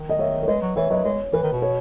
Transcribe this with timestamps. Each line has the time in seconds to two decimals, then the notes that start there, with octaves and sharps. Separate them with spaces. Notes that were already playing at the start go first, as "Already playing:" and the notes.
Already playing: D#3
0.09 D#5
0.19 C#5 E5
0.43 C#5
0.48 G#3 B4 D#5
0.62 F#3
0.76 E3 C#5 E5
0.90 F#3 B4 D#5
1.04 G#3 C#5
1.33 E3 B4
1.43 D#3
1.52 B2
1.62 C#5